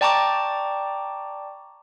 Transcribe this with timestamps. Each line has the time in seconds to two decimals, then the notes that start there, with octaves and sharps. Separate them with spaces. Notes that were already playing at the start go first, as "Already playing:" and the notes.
0.01 D5 G5 A5 A#5 C#6 D6